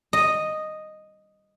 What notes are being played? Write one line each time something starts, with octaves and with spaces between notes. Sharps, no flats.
D#5